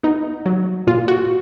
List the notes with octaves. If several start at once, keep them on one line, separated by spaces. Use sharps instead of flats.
B3 D#4
F#3
A#2 F4
F#4